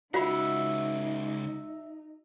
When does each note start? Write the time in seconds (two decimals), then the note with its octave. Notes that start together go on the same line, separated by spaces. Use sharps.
0.14 C#2 D#4 F4 F#4 E5 F#5 B5